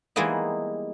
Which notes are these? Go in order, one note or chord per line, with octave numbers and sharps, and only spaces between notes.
E3 G3 G#3 A#3 B3 D#4